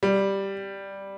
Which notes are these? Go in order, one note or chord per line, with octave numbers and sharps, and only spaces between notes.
G3